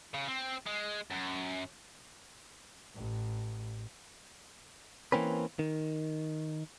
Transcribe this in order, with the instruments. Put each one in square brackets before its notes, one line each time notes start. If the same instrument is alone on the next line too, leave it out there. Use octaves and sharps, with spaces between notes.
[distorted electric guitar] C#3
C4
G#3
F#2
[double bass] A1
[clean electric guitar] E3 A#3 C4 C#4 B4
D#3